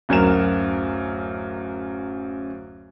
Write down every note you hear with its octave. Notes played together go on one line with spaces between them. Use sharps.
D1 F#2 F#3 A#4 E7